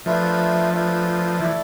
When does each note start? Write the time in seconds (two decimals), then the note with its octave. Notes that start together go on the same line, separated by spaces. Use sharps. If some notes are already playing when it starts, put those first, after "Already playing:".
0.06 F3 A3 D4 F4 B4 E5
0.73 A3 D4 F4 B4 E5
1.40 E3 A3 E4 A4 D5